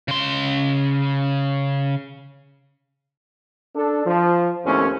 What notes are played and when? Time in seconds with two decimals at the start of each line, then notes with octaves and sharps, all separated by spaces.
0.08 C#3 C6
3.75 D4 A4
4.06 F3
4.66 D#2 A2 F3 C4 C#4